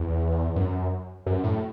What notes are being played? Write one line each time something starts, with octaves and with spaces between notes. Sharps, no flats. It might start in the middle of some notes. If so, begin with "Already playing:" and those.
Already playing: E2
F#2
F#2
A2